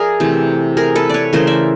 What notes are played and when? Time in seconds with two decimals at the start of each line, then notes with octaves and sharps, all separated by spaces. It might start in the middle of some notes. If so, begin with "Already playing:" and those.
Already playing: F3 G#4 A#4 D5 E5
0.20 C3 E3 A3
0.77 G#4 A#4
0.95 A4 B4
1.09 B4 C#5 D5
1.33 C#3 E3 A3 A#4 C5
1.47 D5 E5